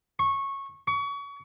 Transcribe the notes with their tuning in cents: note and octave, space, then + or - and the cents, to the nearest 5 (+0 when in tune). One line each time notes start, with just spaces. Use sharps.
C#6 -15
C#6 +30